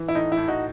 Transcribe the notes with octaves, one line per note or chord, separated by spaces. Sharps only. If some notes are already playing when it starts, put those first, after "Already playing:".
Already playing: E3
E4
A2 D#4
E4
A2
D#4 F#4